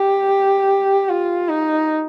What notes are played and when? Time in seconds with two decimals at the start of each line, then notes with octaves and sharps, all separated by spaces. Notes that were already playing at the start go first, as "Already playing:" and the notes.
Already playing: G4
1.09 F4
1.49 D#4